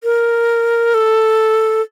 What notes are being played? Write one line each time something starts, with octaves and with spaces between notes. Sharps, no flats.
A#4
A4